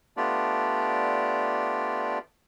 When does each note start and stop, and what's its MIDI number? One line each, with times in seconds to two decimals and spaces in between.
0.17 2.19 57
0.17 2.19 59
0.17 2.19 62
0.17 2.19 65
0.17 2.19 67
0.17 2.19 74